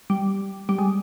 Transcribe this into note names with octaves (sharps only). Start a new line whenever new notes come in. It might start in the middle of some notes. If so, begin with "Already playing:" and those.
G3
G3
G#3